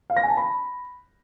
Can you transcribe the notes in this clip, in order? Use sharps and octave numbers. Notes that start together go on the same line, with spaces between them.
F5
A#6
G#5
A5
B5